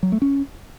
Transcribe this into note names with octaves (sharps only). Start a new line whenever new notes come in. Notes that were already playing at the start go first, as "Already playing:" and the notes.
F#3
A3
C#4